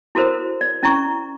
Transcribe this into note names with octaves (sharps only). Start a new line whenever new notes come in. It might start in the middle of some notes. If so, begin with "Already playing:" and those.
E4 F#4 A4 A#4 C5
D5
C#4 E4 D5 A#5 C#6